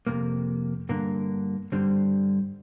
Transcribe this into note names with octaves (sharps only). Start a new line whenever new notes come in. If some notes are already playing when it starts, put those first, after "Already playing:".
F2 C3 A#3
G2 D3 A#3
G2 D3 G3 C4